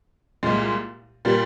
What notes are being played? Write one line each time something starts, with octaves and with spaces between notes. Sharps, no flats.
C2 A#2 G#3
A#2 G3 A#3